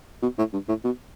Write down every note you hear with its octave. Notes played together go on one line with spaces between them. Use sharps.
B2
A2
G2
A2
B2